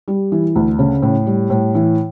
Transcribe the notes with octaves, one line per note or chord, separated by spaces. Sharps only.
G3
E3
D2
C#3
A2
G3
A2
E3